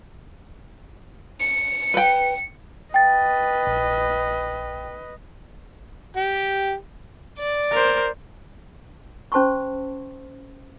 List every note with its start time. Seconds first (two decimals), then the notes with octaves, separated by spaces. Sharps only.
1.40 C#7
1.94 B4 G5
2.94 B4 D#5 G5 A6
3.67 A#1
6.16 G4
7.39 D5
7.71 A#4 C5
9.32 C#4 C5 A5 C6 C#6